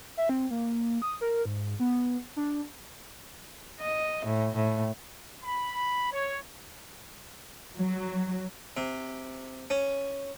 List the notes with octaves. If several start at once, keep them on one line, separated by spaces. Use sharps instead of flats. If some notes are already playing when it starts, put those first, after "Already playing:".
E5
C4
A#3
D#6
A#4
G#2
B3
D4
D#5
A2
A2
B5
C#5
F#3
C3
C#4